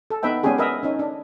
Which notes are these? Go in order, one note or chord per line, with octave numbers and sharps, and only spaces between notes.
A4
B3 D#4 B4 E5 G5
G#3 B3 C#4 D4 G4 G#4
A#4 B4 D#5 E5
C#4 D#4
D4